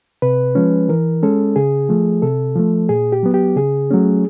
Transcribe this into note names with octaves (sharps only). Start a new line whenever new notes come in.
C3 B4
F3 G#3 C#4
E3 A#4
G#3 C#4 A4
C#3 G#4
F3 A3
C3 A4
F3 A3
A#2 G#4
G4
F#3 B3
G4
C#3 G#4
F#3 A3 C#4